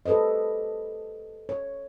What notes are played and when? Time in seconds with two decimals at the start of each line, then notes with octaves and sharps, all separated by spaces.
0.06 G4 A4 B4 C5 D#5
1.49 C#5